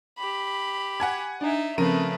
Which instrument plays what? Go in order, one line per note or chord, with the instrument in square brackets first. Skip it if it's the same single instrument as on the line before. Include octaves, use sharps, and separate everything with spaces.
[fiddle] G4 B5
[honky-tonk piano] F#5 G#5 G#6
[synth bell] D4 [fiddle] D#4 E5
[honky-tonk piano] C#3 A#4 D#7 [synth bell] F3 C4 [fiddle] A3 B4